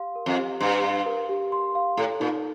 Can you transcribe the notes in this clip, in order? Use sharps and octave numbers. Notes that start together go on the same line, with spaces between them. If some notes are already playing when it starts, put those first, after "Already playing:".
Already playing: G4 F5 C6
A#4
F2
G4
G2 C6
F5
A#4
G4
C6
F5
A2 A4
A#2 D#4